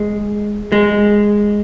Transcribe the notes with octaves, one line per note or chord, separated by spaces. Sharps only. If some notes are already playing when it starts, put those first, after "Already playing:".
Already playing: G#3
G#3